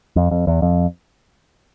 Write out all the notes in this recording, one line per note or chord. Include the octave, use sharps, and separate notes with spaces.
F2
F2
E2
F2